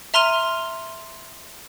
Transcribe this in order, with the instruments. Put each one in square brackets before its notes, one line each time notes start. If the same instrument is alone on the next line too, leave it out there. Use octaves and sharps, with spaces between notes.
[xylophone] E5 A#5 C6 F6 D#7 F7